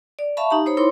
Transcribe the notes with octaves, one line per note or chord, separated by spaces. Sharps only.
D5
E5 F5 A5 B5 C#6
D#4 G4 A#5
D#4 C5 C#5 B5
E4 A#4 C#5 C6 D6